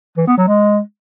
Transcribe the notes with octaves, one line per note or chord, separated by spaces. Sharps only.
E3
B3
F#3
G#3